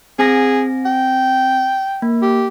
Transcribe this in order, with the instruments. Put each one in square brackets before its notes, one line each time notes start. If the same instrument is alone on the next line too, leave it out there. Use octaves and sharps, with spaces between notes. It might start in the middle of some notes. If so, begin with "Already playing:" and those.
[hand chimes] C4 G#5 A#6 [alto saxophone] G#4
[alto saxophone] G5
[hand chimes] A#3
[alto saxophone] G4